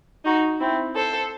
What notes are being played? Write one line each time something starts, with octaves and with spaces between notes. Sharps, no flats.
D#4 F#4
C4 E4
A4 C5